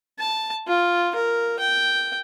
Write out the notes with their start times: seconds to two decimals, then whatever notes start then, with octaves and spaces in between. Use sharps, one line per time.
0.19 A5
0.68 F4
1.16 A#4
1.59 G5